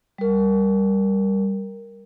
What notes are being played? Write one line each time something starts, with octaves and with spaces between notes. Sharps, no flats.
G3 A#4